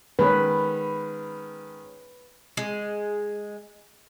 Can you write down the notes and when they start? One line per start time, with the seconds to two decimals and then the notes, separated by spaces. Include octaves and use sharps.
0.19 D#3 G#3 C#4 B4
2.57 G#3